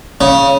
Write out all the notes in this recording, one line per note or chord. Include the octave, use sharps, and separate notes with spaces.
C#3